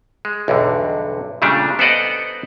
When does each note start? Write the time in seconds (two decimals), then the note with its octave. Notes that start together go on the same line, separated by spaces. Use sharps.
0.25 G#3
0.48 B1 E2 G2 D3
1.42 A#2 C#3 G3 A3 D4
1.79 B3 A4 C5 D5 D#5 F#5